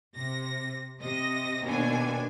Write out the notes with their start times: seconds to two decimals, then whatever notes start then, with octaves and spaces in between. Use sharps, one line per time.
0.14 C3 A#6
1.02 C3 D#5 A#6
1.64 D#2 B2 D4 G#5